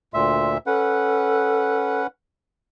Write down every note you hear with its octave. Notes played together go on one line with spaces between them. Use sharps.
D2 A#2 E5 C6
C#4 A4 B4 F#5